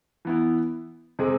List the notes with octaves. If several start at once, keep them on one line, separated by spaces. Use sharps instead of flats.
E3 B3 E4
C3 G#3 C4 G#4